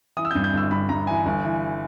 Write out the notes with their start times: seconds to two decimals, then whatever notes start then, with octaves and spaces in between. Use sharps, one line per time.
0.17 E3 D#6
0.25 E6
0.31 G6
0.35 G2
0.44 G6
0.53 G1 E6
0.71 G2 B5
0.89 G2 A#5
1.07 E3 G#5
1.26 G1
1.44 E3